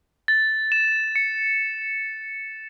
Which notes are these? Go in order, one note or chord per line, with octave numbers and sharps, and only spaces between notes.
A6
E7
C#7